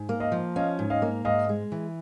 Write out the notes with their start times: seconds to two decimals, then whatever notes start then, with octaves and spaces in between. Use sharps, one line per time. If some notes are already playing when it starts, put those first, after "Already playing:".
Already playing: G#2
0.09 A#3
0.20 D#5 F5
0.32 F3
0.56 C#4 D#5 F5
0.79 G#2
0.90 D#5 F5
1.02 A#3
1.25 G#2 D#5 F5
1.49 G#3
1.72 E3